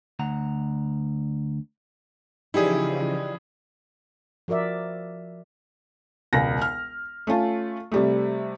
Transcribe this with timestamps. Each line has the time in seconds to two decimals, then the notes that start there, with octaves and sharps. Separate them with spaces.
0.19 D2 F#5 A#5
2.54 C#3 E3 F3 D#4 E4 G4 G#4 D5
4.48 F3 F#4 A#4 D5 E5
6.33 E1 C#2 A#6
6.62 F6
7.27 A3 C#4 F4 A5
7.92 C3 G3 A3